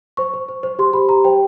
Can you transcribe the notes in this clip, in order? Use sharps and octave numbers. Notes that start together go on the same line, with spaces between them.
C5 C#6
C5
C5
C5
G4 C6
G4 B5
G4 A#5
C5 G5